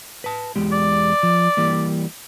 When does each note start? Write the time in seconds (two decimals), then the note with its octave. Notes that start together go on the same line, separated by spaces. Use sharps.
0.24 B4 A5
0.56 E2 G#3 G4
0.72 D5
1.23 F3
1.57 E3 G3 A#3